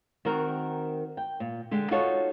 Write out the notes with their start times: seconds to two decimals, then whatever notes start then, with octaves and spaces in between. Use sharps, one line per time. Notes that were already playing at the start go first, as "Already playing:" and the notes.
0.25 D#3 C4 F#4 A#4
1.17 G5
1.40 A#2
1.71 D3 G#3 G4
1.91 D#4 F4 F#4 A4 C#5